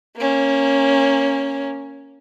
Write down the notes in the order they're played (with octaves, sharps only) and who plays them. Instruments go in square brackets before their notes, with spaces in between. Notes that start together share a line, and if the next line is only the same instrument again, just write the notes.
[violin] A#3 C#4